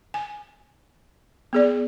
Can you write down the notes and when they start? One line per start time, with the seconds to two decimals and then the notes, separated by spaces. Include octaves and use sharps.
0.14 G#5
1.53 B3 G#4 D5